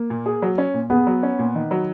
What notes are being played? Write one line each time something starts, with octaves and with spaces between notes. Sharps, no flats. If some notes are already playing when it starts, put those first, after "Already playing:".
Already playing: A#3
A#2
G#4
F#3
C#4
A#2
B3 G#4
F#3
C#4
A#2
D#3
F#3